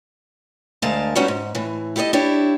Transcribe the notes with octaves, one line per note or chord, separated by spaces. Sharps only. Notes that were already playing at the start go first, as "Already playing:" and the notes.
D2 G#3 A3 A#4 F5 A5
G3 A3 B3 C#4 D#4 F#4
G#2
A2 E3
E4 G4 A4 C#5 D#5
D4 E4 G4 C#5